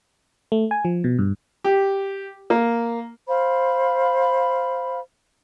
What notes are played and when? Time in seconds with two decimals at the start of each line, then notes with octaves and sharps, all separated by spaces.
0.52 A3
0.71 G#5
0.85 F3
1.04 B2
1.19 G2
1.64 G4
2.50 A#3
3.27 C5 F5 B5